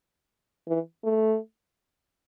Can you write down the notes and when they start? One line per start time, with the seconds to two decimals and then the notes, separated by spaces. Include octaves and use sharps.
0.68 E3
1.04 A3